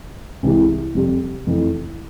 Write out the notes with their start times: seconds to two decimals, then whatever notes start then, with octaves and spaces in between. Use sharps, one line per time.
0.43 C2 C3 E3 G#3
0.95 F2 C3 G3
1.47 F1 F2 E3